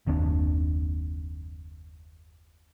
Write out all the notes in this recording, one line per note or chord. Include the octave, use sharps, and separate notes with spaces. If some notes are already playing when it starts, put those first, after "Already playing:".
F#1 D#2 C4 D4